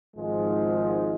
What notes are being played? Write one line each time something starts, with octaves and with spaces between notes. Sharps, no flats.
G#1 G#2 F3 G#3